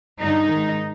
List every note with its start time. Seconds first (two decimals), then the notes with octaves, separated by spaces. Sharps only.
0.21 G2 D3 D#4
0.51 G#2 D#3